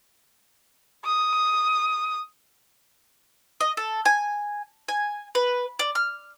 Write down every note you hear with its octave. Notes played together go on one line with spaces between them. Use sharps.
D#6
D#5
A4
G#5
G#5
B4
D5
F6